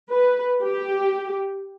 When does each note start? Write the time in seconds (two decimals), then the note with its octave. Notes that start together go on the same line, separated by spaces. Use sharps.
0.10 B4
0.63 G4